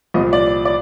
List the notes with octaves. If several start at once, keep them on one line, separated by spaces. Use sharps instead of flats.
C2 A#2 F3 D#5
D5
D5